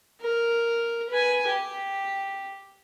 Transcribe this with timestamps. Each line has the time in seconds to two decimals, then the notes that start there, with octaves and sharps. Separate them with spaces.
0.21 A#4
1.10 B4 G#5
1.47 G4